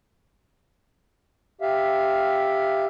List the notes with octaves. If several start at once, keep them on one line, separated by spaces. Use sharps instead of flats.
G4 E5 F5